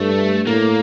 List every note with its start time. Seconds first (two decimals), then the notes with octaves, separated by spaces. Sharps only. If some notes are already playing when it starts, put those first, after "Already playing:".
Already playing: G2 A3
0.47 A2 A#3